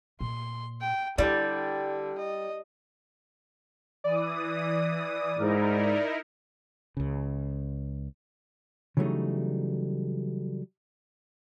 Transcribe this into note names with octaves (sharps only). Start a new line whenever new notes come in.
A#2 C6
G5
D3 G3 E4
D#5
E3 D5 D#6
G#2 D#4 E4 A#4
C#2 C#3
C#3 E3 F#3 G3 A3 D#4